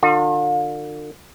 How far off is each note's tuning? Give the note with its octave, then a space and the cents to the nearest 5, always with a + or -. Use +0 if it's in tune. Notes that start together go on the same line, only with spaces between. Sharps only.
D3 +40 F4 +45